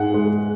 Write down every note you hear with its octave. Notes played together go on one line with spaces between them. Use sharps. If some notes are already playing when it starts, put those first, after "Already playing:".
Already playing: G#2 G#3 F#5
G#3